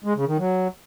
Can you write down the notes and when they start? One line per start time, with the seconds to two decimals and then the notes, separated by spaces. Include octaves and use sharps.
0.04 G#3
0.16 C#3
0.27 D#3
0.38 F#3